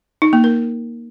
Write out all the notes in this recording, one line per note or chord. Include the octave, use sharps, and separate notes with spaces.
D#4
A#3
A#4